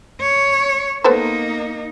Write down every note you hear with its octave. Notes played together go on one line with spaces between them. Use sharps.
C#5
A#3 B3 D#4 A4 C5